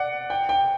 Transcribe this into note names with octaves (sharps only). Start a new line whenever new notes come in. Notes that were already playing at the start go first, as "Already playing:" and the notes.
Already playing: D5 F#5
G5
G5